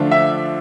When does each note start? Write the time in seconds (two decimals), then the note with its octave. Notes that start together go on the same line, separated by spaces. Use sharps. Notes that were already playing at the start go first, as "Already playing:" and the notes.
Already playing: D3 F3 A3 D4 F4
0.11 E5